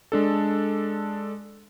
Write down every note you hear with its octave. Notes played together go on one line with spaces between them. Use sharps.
G#3 D4 A4